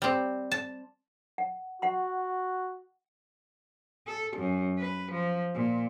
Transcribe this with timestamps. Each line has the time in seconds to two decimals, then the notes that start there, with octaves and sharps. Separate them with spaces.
0.02 G3 C4
0.51 A5
1.38 F#5
1.82 F#4 F#5 C6
4.07 A4
4.36 F#2
4.79 B4
5.12 F3
5.55 A#2